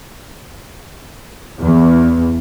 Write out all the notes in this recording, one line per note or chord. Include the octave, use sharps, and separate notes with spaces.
E2